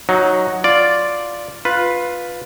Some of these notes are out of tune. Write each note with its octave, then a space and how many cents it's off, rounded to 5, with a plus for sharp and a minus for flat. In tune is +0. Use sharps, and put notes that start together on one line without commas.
F#3 +0 D#4 +10
F4 +0 D5 +0
F4 +10 B4 +0